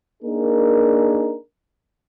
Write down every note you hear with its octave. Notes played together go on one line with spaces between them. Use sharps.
A#3 D4 D#4 G#4 A#4